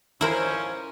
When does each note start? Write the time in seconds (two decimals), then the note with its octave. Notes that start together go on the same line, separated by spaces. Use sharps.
0.21 G#2 F3 C#4 E4 A#4 C5